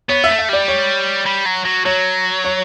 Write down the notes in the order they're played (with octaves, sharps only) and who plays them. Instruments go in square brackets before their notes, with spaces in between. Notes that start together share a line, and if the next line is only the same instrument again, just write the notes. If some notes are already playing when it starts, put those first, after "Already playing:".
[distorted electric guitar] B3 [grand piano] C#5
[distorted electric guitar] A3 [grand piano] E5
[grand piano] E5
[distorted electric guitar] G3 [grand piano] D5
[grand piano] C#5
[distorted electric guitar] G3
F#3
F#3
[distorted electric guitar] F#3 [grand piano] C#5
[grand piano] C#5